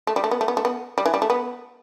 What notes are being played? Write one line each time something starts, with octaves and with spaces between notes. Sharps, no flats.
A3
G3
A3
B3
A3
B3
A3
B3
G3
E3
G3
A3
B3